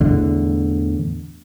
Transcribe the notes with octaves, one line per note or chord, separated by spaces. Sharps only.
E2 A2 D3